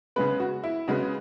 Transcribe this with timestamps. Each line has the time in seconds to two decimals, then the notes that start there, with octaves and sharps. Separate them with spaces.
0.16 C#3 G#3 B3 B4
0.40 F#4
0.64 E4
0.88 C#3 G#3 B3 F#4